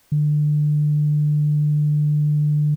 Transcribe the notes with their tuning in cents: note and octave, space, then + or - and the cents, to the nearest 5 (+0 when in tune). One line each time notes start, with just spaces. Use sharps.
D3 +25